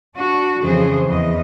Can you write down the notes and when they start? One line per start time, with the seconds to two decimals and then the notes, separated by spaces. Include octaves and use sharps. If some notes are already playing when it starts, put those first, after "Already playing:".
0.16 D4 F#4
0.61 F2 C#3 E3 G#4 C5
1.08 E2 E3 D#5